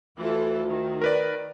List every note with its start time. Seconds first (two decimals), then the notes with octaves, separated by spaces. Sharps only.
0.18 D2 E3 F4 A4
0.67 D#3
1.01 A#4 B4 D5